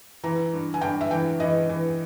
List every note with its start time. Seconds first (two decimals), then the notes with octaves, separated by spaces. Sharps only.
0.24 E3 A#5
0.53 G2
0.74 G#5
0.81 G2 G5
1.01 E5
1.11 E3 G5
1.40 E3 D#5
1.69 E3